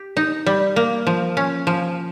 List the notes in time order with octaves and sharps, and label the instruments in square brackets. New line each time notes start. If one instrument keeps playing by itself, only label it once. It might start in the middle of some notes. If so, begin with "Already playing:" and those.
Already playing: [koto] G4
D#4
G3
A#3
F3
C#4
F3